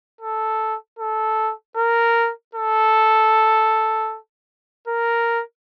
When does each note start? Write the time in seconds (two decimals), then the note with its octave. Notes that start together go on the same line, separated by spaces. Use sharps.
0.21 A4
0.99 A4
1.77 A#4
2.55 A4
4.88 A#4